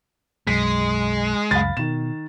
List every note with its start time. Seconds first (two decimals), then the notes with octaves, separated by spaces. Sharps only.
0.47 B1 F#2 G#3 B6
1.51 C#2 F#2 F5 B5 A6
1.77 B2 D#3 E7